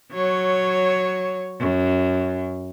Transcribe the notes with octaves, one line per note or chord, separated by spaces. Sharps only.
F#3 C#5
F#2